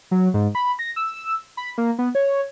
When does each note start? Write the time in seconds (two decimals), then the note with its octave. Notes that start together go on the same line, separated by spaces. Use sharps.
0.11 F#3
0.34 G#2
0.55 B5
0.79 A#6
0.96 E6
1.57 B5
1.78 A#3
1.99 B3
2.15 C#5